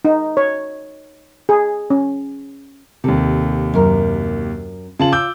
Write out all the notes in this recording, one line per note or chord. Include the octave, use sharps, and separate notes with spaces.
D#4
C#5
G#4
C#4
D#2 C3 A4
F#2 A#4
C#3 F4 C#5 A5 F#7
D6 E6 G6